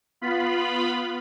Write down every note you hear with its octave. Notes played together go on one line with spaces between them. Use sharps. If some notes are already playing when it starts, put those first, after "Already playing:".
B3 F4 B5